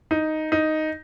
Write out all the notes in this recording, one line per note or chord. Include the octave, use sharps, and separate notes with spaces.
D#4
D#4